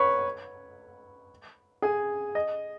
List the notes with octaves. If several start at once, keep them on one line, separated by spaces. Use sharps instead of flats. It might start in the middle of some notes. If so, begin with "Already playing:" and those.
Already playing: B4 C#5 B5 C#6
G#4 G#5
D#5